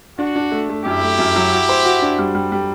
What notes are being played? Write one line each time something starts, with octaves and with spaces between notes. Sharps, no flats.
D4 F#4
D4
A3
A3
F#2 E4 G4
A3
F#2
F#3
F#4
C5
F#4
D4
G3
G3
G3